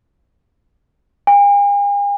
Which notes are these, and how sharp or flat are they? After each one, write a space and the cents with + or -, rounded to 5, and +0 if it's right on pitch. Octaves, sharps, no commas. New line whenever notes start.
G#5 -45